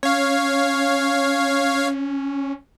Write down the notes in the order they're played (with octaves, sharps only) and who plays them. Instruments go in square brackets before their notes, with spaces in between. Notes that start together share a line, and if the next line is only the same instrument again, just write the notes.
[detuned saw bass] C#4 [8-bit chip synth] C#5 F5